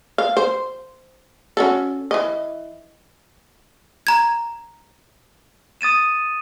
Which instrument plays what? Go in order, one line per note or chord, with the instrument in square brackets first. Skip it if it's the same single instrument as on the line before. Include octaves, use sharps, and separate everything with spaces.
[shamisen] F5
C5
C#4 F#4 A4
E3 D#5
[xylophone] A#5 G#6
[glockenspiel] D#6 A6 D#7 E7